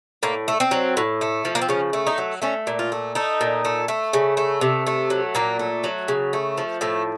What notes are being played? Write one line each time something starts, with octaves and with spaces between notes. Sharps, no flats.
A2 A#3
A3
C4
F#3
A2
A3
F3
A#3
C4
C#3 C#4
A3
D#4
F#3
A3 C#4
A#2
F4
A3
A3 D#4
A#2
A3
A3
C#3
A3
C3
A3
F#3
A#2 A#3
A3
F#3
C#3
A3
F3
A2 A3